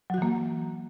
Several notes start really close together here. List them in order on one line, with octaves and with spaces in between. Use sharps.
F#3 F#4 E3 A#3